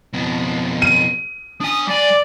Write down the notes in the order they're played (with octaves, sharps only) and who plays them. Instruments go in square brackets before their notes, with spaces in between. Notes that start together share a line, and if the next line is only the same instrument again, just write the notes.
[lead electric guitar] F2 B2
[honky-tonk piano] D#7
[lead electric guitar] D4 G#5 [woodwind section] D#6
[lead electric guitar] G3 G#5 [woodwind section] D5